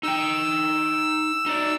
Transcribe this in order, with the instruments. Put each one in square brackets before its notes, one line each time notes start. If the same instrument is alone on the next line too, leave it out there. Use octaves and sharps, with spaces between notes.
[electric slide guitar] D#4 G5 [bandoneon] E6
[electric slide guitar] D#4 D5